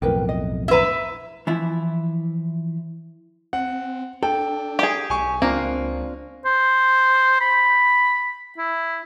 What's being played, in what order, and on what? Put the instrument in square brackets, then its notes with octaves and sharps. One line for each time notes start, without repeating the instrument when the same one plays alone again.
[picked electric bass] B1 F2 A2 [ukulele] A#4 B4 G5
[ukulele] D#5
[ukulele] E4 A#5 [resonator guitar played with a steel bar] B4 E5
[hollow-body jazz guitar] E3 F3 E4
[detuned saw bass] C4 [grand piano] F#5
[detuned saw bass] D4 [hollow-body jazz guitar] A4 [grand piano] G5
[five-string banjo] G4 G#4
[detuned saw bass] B1 [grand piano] G#5 C#6
[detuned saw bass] C#2 [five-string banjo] A#3 [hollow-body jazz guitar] C4 D4 F4
[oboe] C5
B5
E4